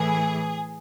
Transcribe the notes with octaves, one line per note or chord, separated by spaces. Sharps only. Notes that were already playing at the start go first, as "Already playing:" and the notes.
Already playing: A2 E3 G#4